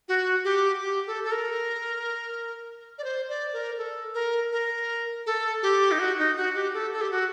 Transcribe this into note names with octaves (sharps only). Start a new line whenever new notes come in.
F#4
G4
G4
A4
A4
A#4
D5
C5
D5
A#4
A4
A#4
A#4
A4
G4
D#4
F#4
D#4
F#4
G4
A4
A4
G4
F#4